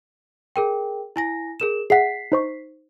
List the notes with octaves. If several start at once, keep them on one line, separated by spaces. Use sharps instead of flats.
G#4 A#4 G5
E4 G#5 A#6
G#4 A#4 E7
G#4 E5 F#5 B6 C7
D#4 C5 C#6